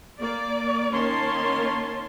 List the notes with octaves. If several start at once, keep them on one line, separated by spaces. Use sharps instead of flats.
A#3 D5
D#3 A#3 C#4 C#5 A5 C6